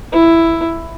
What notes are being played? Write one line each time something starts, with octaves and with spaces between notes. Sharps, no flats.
E4